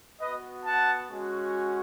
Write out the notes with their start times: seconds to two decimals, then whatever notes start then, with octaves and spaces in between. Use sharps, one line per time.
0.21 B3 F#4 B4 D#5
0.66 F#5 A5
1.10 G#3 C#4 F#4